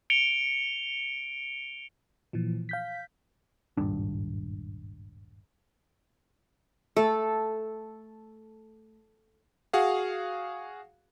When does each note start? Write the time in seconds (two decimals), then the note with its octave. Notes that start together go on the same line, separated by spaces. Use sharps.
0.10 C#7 D7 F7 G7
2.33 A#2 E3 F3
2.69 F5 G6 B6
3.77 D#1 G#1 G2 D4
6.97 A3 A4
9.73 F#4 G#4 F5 F#5